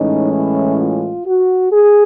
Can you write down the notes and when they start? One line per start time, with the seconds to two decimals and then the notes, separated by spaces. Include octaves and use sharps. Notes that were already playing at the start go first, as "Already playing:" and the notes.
Already playing: A2 E3 G#3 C#4 D#4
0.33 E4
0.80 F4
1.26 F#4
1.71 G#4